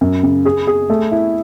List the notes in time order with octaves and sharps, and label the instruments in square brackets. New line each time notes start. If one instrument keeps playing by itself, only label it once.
[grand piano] F#2
C#3
G#4
G#4
A3
E4